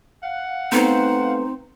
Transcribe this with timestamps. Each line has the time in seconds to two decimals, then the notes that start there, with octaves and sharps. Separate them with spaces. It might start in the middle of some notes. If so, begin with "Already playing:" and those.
0.23 F5 F#5
0.72 A3 B3 C4 D#4 C5